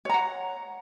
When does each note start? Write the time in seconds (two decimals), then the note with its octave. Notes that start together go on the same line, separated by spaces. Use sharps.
0.05 C#5
0.10 A#5
0.14 F#5